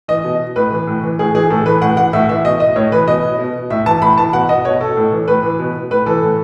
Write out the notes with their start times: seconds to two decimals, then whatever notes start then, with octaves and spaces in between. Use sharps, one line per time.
0.08 E3 D#5
0.24 B2
0.56 A2 B4
0.72 E3
0.87 A2
1.03 E3
1.19 A2 G#4
1.34 E3 G#4
1.50 A2 A4
1.66 E3 B4
1.82 A2 F#5
1.97 E3 F#5
2.13 A2 E5
2.29 E3 E5
2.45 B2 D#5
2.60 D#5
2.76 A2 C#5
2.92 E3 B4
3.07 B2 D#5
3.39 B2
3.70 A2 E5
3.86 E3 A5
4.02 A2 B5
4.18 E3 A5
4.33 B2 F#5
4.49 D#5
4.65 B2 C#5
4.81 A4
4.97 A2
5.12 E3
5.28 A2 B4
5.43 E3
5.59 B2
5.90 A2 B4
6.06 E3 A4
6.22 A2